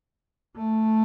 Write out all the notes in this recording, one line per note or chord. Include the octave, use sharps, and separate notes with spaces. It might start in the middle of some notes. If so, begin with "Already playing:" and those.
A3